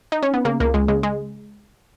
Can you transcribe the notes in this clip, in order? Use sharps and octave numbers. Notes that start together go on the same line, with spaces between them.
D#4
C#4
B3
C#3 A#3
C#2 A#3
C#2 G#3
C#3 G#3
G#3